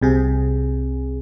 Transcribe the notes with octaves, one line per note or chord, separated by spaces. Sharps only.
C2 C3 G#4